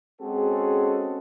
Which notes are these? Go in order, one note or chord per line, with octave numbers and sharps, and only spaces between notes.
G#3 C4 C#4 F#4 G#4 A4